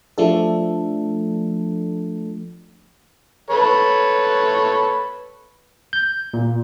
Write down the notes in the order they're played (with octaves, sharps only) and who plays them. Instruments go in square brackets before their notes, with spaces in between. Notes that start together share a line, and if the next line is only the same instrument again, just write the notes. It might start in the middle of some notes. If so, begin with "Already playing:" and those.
[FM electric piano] F3 A3 D4 A4
[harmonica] A4 B4 C#5
[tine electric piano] G6
A#2